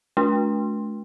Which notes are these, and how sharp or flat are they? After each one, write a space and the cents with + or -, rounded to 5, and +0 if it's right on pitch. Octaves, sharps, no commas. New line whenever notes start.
A3 -35 D4 -40